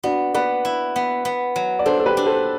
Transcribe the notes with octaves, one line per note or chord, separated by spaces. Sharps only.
B3 D4 F#4
B3 B4 D5
E4
B3
B3
F#3
D5
D4 A4 C5
A4
G4 B4
D4
A4 C5